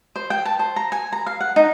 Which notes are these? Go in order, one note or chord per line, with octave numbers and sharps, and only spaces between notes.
C5
G5
A5
C5
A#5
G#5
A#5
F5
F#5
D#4